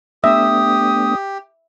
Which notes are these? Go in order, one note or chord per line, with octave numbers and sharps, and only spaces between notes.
A3 B3 D4 G4 E5 D#6